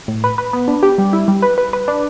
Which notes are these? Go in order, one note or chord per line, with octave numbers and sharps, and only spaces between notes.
A2
B4
B4
B3
D4
G4
G3
E4
G3
B4
B4
B4
D4